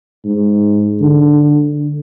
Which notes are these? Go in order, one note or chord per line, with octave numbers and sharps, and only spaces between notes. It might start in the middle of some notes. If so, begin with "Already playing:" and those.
G#2
D3